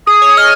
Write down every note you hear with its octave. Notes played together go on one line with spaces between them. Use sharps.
G#4 D#6
C#5
D#5 F6